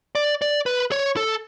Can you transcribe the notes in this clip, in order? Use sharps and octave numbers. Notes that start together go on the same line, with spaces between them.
D5
D5
B4
C#5
A4